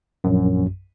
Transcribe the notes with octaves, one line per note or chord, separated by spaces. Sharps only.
A#1 F#2